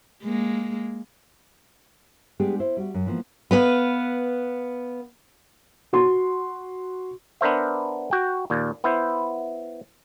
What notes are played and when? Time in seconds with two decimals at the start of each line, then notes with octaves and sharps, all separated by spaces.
0.24 G#3 A#3
2.39 G3 G#3 B3 D4 G4 G#4
2.60 E4 C5
2.77 G3 F#4
2.94 F#2
3.06 E3 F3 A#3 B3
3.51 B3 B4 F5
5.93 F#4 C6
7.41 B3 D4 A#4 C5 E5
8.11 F#4 G5
8.50 D#2 A#2
8.84 B3 E4 C5